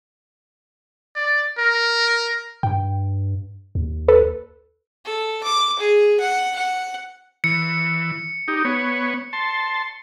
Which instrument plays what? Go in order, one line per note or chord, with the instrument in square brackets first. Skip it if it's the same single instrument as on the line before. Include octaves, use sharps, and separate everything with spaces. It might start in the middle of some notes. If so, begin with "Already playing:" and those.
[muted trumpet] D5
A#4
[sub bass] G2 [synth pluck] G5
[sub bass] D#2
[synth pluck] A4 B4
[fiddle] A4
D6
G#4
F#5
F#5
[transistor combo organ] E3 [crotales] C#7
[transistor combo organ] D#4 G4
B3 C#5
A5 C6